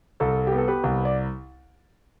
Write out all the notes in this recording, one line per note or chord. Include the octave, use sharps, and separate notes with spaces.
C2 A4
G4
B3
A4
G4 B4
C2
D5